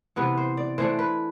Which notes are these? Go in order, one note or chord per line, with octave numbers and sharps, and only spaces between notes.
C3 E3 B3 B4
C5
D5
E3 A3 D4 C5
B4